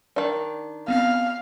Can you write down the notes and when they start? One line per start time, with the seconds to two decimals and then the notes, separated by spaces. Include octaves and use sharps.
0.16 D#3 D4
0.88 B3 C4 F5 F6